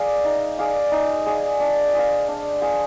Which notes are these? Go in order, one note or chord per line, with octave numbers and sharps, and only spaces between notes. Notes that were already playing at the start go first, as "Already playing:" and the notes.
Already playing: G#4 D5 F5
D#4
G#4 D5 F5
D#4
G#4 D5 F5
D4
G#4 C5 F5
D4
G#4 C5 F5